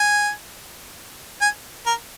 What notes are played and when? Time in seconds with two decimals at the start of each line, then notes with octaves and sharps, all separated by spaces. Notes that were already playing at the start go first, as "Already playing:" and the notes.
Already playing: G#5
1.41 G#5
1.86 A#4